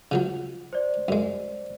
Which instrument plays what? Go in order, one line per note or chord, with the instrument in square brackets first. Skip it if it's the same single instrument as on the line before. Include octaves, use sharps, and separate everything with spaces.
[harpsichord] C#3 F3 F#3
[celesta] C5 D5
[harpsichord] F#2 G#3